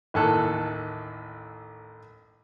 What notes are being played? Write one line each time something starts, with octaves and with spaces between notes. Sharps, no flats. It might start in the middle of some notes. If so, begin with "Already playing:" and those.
A1 D#2 A4 F#6